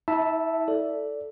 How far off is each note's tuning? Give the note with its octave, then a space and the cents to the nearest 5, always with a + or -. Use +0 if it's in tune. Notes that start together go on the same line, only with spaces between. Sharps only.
E4 -40 E5 +0 A5 +0
A4 +0 D5 -15